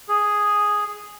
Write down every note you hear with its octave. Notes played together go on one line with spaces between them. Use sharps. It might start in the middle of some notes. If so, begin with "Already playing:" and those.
G#4